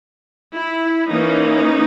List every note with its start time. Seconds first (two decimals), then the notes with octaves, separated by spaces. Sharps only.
0.56 E4
1.09 E3 A#3 C#4 D#4